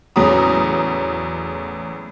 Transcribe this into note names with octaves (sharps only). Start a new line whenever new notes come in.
E2 A2 C#3 F#3 A#5 D#6